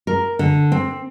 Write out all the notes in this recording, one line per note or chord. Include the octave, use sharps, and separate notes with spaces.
A#4
D3
C4